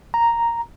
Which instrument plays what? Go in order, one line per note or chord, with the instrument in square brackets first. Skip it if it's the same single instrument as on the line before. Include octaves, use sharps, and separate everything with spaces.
[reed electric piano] A#5